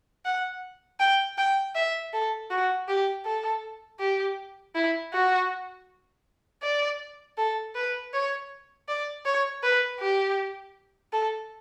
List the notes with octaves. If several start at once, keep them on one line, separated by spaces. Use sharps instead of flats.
F#5
G5
G5
E5
A4
F#4
G4
A4
G4
E4
F#4
D5
A4
B4
C#5
D5
C#5
B4
G4
A4